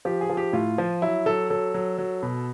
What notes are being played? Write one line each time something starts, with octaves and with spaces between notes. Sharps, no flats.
F3 G4
G#4
F3
G4
A2 F4
F3
F#3 E4
F#3 A4
F#3 A4
F#3
F#3
B2